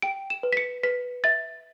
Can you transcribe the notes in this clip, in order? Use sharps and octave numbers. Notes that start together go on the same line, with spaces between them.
G5 D7
E7
B4
B6
C#7
B4 B6
E5 A6